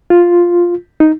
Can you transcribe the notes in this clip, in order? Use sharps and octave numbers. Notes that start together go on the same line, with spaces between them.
F4
D#4